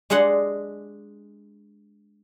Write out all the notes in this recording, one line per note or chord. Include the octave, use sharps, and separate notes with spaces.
G#3 D4 G#4 F#5 C6